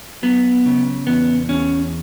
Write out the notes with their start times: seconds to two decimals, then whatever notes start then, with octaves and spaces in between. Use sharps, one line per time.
0.23 F#3 B3
0.66 C#3
1.07 E2 B3
1.49 E2 C#4